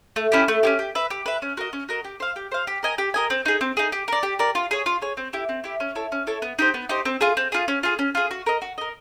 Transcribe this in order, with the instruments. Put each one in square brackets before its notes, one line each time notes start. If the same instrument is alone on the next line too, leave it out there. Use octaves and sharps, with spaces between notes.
[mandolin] A3
C#4 E4 G4
A3
C#4 E4 G4
G4
B4 E5
G4
B4 E5
C#4
F#4 A#4 D#5
C#4
F#4 A#4 D#5
G4
C5 F5
G4
C5 F5
G4
A#4 D#5 G#5
G4
A#4 D#5 G#5
C4
D#4 G#4
C4
D#4 G#4
G4
A#4 D5
G4
A#4 D5
F4
G#4 C#5
F4
G#4 C#5
C4
E4 G4
C4
E4 G4
C#4
E4 A4 C#5
C#4
E4 A4 C#5
B3
D#4 G4 C5
B3
D#4 G4 C5
C4
F4 G#4
C4
F4 G#4
C#4
F4 G#4
C#4
F4 G#4
F#4
A#4 D#5
F#4
A#4 D#5